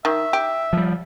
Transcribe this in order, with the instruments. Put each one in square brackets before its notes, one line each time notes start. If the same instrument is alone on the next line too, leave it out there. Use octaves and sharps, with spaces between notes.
[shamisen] D#3 [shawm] E5
[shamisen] G4
[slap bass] F3 G3